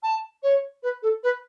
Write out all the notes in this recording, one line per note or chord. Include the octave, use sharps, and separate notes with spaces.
A5
C#5
B4
A4
B4